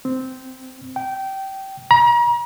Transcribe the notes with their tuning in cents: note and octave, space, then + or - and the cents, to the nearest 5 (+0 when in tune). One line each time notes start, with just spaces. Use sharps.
C4 -10
G5 -20
A#5 +40